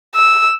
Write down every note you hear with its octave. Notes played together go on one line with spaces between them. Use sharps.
E6